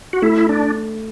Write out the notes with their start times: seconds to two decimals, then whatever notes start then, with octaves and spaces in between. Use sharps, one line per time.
0.13 F#4
0.22 A3 E4
0.49 D4